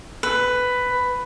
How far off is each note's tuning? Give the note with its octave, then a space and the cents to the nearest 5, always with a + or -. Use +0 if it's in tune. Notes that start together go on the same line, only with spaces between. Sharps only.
B4 +10